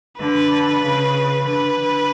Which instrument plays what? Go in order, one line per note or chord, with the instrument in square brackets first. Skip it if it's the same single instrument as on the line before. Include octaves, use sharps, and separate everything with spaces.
[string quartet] D3 [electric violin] B4
[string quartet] C#3
[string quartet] D3 [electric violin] B4
[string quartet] D3